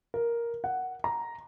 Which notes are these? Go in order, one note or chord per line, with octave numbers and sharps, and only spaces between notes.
A#4
F#5
A#5